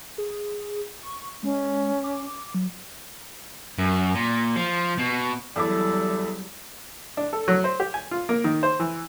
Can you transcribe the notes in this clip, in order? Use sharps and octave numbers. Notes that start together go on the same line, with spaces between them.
G#4
C#6
G#3 C#4
D6
F#3
F#2
A#2
F3
B2
E2 F#3 G3 E4 A4 D6
D4
A4
F#3
C5
G4
G#5
F4
A#3
D#3
C5
E3